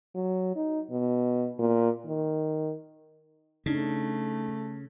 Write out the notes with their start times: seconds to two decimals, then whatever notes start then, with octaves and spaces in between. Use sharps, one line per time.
0.15 F#3
0.56 D#4
0.90 B2
1.59 A#2
2.06 D#3
3.66 C#3 A3 D4 D#4